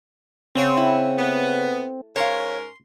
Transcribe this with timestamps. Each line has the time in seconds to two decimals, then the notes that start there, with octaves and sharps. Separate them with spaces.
0.55 C#3 C4 C#5 F#5
0.77 E4
1.19 A3 B3
2.16 G#2 C#4 A#4 C#5 F5 C6